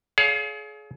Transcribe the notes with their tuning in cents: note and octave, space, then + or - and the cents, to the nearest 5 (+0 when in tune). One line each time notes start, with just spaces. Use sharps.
G#4 +35 C#5 +45 F5 +0